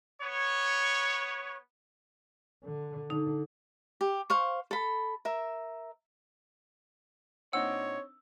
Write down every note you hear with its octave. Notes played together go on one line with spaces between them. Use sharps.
B3 C#5
D3
D3 D#4
G4
C5 F5 C#6
A4 B5
A#4 E5
A#2 C4 D4 D#4 C#5 F#5 E6